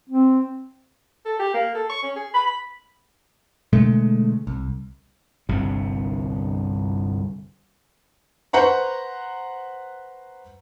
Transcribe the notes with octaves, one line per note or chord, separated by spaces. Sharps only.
C4
A4
G4
A#3
A4
C#6
C#4
G#4
B5
B5
B2 D3 G#3 A3
C2
G1 C2 G2 C3
B4 C5 F#5 A#5 C#6